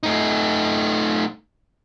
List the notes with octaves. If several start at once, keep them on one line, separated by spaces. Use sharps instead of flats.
A3 D#4